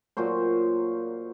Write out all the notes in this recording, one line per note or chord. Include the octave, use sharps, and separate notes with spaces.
A#2 F#3 F#4 C5